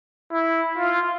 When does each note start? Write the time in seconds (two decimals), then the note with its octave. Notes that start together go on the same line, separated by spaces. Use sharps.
0.31 E4
0.78 F4